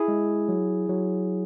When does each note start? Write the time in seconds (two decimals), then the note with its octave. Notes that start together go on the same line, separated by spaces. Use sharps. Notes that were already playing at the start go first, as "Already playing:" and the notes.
Already playing: E4 G#4
0.08 G#3
0.48 F#3
0.89 F#3